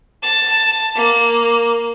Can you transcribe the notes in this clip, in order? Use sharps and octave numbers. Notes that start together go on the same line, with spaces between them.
A5
A#3